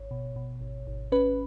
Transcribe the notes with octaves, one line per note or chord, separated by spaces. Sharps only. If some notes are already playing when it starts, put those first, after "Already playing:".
Already playing: G#1 C#5
B2
B2
G#1
G#1
C#4 B4